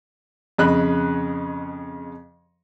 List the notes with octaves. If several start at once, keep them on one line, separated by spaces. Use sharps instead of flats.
F2 C#3 D#5 B5 F#6